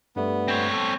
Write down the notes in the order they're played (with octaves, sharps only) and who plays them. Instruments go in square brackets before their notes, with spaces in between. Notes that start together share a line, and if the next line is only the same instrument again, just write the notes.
[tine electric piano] G2 G3 A3 [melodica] B3
[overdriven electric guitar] C4 C#5
[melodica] A4